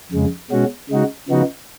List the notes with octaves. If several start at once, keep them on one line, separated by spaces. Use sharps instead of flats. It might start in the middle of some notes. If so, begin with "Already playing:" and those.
F2 C#3 G#3
B2 G#3 C#4 F#4
C#3 G#3 D#4 F#4
C#3 F3 B3 D#4 F#4